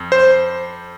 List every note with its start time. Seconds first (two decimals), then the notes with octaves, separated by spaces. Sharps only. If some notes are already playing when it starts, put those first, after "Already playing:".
Already playing: F2
0.12 C5